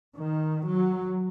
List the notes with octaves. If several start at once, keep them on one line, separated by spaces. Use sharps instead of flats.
D#3
F#3